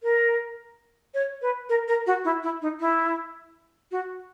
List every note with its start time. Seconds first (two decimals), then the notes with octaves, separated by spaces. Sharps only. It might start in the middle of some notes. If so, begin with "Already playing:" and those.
0.03 A#4
1.14 C#5
1.42 B4
1.69 A#4
1.88 A#4
2.07 F#4
2.25 E4
2.43 E4
2.62 D#4
2.81 E4
3.91 F#4